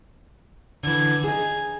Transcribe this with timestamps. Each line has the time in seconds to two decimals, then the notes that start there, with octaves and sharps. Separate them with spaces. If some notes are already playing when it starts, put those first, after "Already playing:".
0.83 D3 E3 G#6
1.24 D#4 G#4